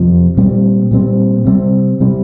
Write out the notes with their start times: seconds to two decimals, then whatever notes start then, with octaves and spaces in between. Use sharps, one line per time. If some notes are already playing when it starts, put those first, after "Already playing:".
Already playing: F2 C3 F3
0.37 A#2 G3 C4
0.91 A#2 G3 C4
1.46 C3 G3 C4
2.00 C3 G3 C4